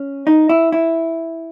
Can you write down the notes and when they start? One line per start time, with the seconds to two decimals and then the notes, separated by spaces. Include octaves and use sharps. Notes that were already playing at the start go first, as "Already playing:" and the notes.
Already playing: C#4
0.27 D#4
0.49 E4
0.72 E4